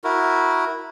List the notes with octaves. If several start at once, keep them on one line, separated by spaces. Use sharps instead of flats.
E4 F#4 A#4